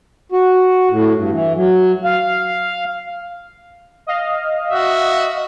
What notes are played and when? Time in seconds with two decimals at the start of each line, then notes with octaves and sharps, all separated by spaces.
0.32 F#4
0.90 A2
1.16 G2
1.31 E3
1.55 F#3
2.04 F5
4.07 D#5 F5
4.71 F#4 E5